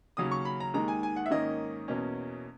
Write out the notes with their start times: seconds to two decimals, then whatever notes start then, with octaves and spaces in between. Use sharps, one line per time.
0.17 D#2 C#3 F#3 C#4 D#6
0.31 C#6
0.45 B5
0.60 A#5
0.74 D#2 D#3 G#3 A#5
0.88 G#5
1.03 G#5
1.16 F#5
1.26 E5
1.31 G#2 D#3 A#3 C#4 D#5
1.88 E2 B2 A#3 C#4